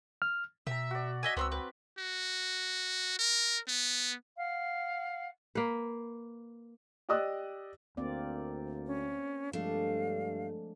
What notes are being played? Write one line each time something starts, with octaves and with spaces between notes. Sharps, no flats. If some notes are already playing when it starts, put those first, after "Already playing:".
F6
B2 E5 G5 A#5
F#4 D5
D#5 E5 G#5
C#2 B3 C4 C6 E6
B4 G5
F#4
A#4
B3
F5 F#5
A#3 B4
G4 D5 D#5 D#6 E6 F#6
D2 A#3 C4 D5
C#4
G2 F3 G#3 A3 D4 F5